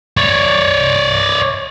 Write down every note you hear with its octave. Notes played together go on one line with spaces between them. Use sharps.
C#5 D5